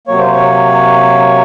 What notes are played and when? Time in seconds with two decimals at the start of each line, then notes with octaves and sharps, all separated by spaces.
0.07 C3 F#3 A#3 C#5
0.19 C5
0.32 C#5